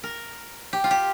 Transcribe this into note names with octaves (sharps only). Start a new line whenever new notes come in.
A#4
G4
F4
G4